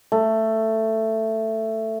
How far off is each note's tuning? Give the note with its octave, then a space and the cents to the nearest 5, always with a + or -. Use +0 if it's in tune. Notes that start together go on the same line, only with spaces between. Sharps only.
A3 +10